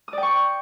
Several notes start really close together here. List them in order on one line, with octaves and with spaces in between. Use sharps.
D#6 D5 G5 C#6